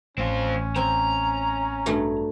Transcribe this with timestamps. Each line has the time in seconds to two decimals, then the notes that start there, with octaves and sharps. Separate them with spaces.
0.18 A1 C4 C#4 F4
0.76 C4 G#5 A#5
1.86 G2 F#3 A3